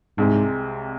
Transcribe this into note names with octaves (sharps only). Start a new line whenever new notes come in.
C2 G#2 C3 G#3